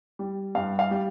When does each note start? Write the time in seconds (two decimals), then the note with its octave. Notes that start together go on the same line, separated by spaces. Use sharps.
0.19 G3
0.55 G2 F5
0.79 F5
0.91 G3